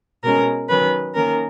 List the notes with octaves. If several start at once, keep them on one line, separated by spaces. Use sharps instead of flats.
B2 G#3 C#4 A#4
D#3 F#3 C#4 B4
D#3 A#3 C#4 A#4